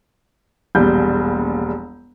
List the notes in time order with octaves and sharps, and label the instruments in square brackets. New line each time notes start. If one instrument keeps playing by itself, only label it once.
[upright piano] E1 A#1 G3 G6